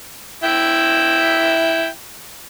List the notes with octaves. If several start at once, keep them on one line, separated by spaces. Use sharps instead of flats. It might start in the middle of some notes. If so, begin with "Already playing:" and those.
E4 E5 G5